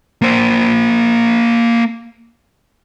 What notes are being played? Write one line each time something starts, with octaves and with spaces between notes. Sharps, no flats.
A#3 C5